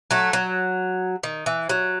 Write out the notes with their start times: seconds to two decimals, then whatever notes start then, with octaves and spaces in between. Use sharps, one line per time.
0.11 F#3 A3
0.33 F#3
1.23 D#3
1.46 E3
1.69 F#3